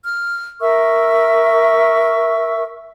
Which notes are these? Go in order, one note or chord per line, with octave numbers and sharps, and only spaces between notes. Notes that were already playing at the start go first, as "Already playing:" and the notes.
F6
A#4 E5 C#6 E6